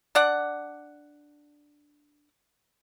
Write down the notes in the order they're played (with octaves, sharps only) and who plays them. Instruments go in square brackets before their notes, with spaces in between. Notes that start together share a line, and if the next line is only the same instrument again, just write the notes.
[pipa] D4 D5 F#5